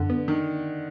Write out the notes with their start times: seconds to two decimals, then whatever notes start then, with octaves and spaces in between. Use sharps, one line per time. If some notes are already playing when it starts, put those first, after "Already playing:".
Already playing: F#2 D3
0.10 B3
0.28 D#3